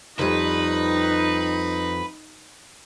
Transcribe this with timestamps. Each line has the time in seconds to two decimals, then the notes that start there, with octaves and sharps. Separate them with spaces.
0.19 F2 G3 D#4 B4